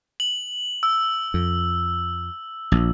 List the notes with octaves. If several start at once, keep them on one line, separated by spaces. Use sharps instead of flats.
F#7
E6
F2
A#1